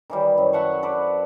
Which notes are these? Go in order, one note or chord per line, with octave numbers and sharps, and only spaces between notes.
D#3 E3 G3
F#2
E5 F#5 A5 C#6
A4 B4 C5 D5